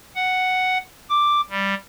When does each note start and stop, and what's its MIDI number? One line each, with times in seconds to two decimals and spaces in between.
0.16 0.78 78
1.10 1.41 86
1.50 1.74 55